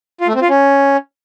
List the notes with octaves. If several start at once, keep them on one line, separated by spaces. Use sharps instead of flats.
F4
A3
C4
F4
C#4